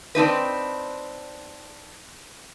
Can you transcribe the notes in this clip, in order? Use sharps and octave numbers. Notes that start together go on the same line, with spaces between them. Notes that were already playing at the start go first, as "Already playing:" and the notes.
C4 D4 D#4 B4